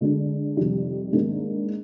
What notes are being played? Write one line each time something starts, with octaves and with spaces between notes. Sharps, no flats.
D3 G#3 D4
F2 C3 D#3 G3
G#2 D#3 A#3 D4